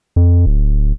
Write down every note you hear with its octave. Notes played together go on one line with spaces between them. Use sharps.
F2
D1